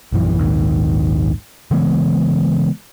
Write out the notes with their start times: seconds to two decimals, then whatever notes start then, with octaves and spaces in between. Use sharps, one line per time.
0.12 A#1 F#2 E3
0.38 A#1 D#2 G#2 D#3
1.71 C#3 E3 G#3 B3